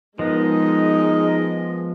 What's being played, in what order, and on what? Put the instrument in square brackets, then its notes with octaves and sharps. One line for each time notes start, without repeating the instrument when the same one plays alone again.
[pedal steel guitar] F3 B3 [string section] G#3 [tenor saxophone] D#4 [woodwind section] A#4 D#5